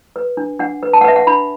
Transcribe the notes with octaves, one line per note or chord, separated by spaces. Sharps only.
B4
D4
D4 F#5
B4
A5
F#5
B4 E5
F#5
D4 B5